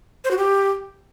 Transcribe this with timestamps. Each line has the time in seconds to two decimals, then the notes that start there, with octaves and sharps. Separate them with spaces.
0.24 C5
0.31 F#4
0.37 G4